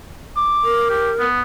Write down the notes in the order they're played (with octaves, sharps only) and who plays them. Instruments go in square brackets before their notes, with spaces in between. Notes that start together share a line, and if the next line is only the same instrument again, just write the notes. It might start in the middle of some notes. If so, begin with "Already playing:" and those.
[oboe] D6
[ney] A#4
[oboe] G4
B3